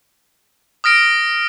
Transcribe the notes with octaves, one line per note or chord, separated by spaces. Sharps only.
D#6 F6 A#6 D7